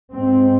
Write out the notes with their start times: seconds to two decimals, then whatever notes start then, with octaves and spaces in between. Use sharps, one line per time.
0.12 G#2 C4